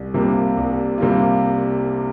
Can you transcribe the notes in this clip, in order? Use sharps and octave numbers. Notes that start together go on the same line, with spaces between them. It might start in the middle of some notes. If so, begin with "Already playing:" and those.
Already playing: C2
C3 G3 A#3 F4
C2
C3 G3 A#3 F4